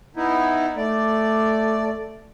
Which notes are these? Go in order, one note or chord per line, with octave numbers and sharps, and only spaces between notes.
B3 D#4 E4
A3 D5